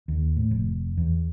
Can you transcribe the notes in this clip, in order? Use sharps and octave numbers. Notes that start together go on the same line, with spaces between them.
D#2
A2
F1
E2